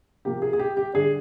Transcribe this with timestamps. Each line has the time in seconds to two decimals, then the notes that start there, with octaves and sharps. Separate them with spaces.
0.25 C3 F3 A#3 G4
0.42 G#4
0.53 G#4
0.59 G4
0.77 G4
0.94 D3 G3 D4 G#4